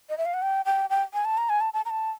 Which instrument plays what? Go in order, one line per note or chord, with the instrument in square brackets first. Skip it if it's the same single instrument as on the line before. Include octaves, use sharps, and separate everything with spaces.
[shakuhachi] D#5
E5
F5
F#5
G5
G5
G5
G#5
A5
A#5
G#5
A5
A5
A#5
A5